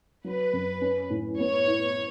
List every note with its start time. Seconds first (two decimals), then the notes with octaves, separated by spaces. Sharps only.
0.24 F#3 B4
0.53 F#2
0.81 C#4
1.10 A2
1.39 B3 C#5
1.67 E4